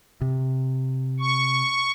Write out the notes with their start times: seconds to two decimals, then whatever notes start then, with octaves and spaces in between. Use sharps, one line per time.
0.21 C3
1.20 C#6